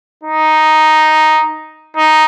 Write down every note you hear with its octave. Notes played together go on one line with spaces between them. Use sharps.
D#4
D#4